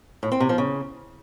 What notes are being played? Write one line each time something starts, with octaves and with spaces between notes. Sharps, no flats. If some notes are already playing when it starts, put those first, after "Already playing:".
A2
C4
C3
F3
C#3